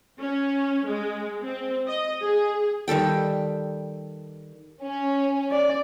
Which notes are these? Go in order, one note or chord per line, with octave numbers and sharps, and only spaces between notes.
C#4
G#3
C4
D#5
G#4
D#3 G3 A4 G5
C#4
D5